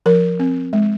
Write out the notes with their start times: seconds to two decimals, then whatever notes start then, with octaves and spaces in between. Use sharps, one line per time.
0.06 F3 A#4
0.39 C4
0.73 G#3